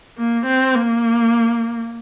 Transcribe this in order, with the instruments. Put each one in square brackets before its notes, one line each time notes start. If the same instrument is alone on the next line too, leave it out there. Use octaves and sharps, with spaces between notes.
[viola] A#3
C4
A#3